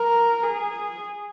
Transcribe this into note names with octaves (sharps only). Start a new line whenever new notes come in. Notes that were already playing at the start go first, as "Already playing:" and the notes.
Already playing: A#4
G#4